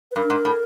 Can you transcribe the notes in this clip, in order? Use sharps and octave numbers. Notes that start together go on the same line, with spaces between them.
B4
G2 A#4
G#2
A2